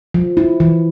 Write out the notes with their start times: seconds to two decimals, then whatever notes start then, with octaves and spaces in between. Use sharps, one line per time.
0.14 F3
0.37 E4
0.60 E3